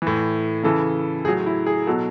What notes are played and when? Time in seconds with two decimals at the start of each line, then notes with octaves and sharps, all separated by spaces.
0.02 A2 E3
0.63 C#3 E3 A4
1.25 A2 G#4
1.28 F#3
1.46 E4
1.67 G#4
1.87 B2 F#3 A4